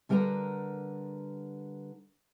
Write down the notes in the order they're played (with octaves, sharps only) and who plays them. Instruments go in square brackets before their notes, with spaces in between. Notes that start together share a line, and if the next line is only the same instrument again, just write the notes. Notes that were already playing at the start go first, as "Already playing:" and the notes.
[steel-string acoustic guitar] D3 G3 A#4 B4 A#5